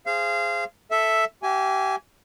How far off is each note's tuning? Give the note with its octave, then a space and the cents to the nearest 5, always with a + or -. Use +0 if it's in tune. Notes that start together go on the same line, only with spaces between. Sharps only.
G#4 +0 C5 +0 F5 -25
A4 +0 E5 +0
G4 -30 E5 +35 G#5 +0